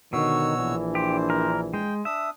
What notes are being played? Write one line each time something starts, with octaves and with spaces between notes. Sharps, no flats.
B2 D3 D#3 F#4 C#5 E6
A#1 E3 D4
G4 C5
A#4
G#3 G5
D4 E5 D#6